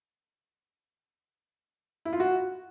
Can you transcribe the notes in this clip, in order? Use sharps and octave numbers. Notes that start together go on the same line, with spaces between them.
E4
F4
F#4